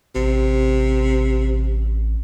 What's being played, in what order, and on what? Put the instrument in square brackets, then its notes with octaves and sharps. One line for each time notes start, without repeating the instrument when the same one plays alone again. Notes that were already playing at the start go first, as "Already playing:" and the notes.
[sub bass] A1 [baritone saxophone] C3